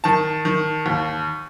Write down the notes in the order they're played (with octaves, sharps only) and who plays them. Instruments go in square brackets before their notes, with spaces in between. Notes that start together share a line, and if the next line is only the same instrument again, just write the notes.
[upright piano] D#3 A5
D#3
D#2